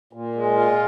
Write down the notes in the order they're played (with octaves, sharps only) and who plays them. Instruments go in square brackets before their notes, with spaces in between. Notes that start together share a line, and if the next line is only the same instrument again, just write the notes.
[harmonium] A#2
G#3
F4